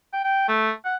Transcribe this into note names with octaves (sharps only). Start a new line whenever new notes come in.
G5
G5
A3
F#5